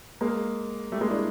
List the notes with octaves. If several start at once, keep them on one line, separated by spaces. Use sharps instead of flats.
G#3 A#3
G3 A3
G#3 A#3
D4 E4